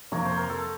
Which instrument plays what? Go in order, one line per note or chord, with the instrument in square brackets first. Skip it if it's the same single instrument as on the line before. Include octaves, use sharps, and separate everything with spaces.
[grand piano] F2 C3 F3 A#3 [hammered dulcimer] C#5
[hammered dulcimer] C5
A#4
A4